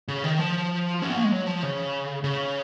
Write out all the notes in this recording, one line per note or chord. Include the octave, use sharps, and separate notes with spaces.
C#3
D#3
F3
C#4
B3
A#3
G#3
F#3
F3
C#3
C#3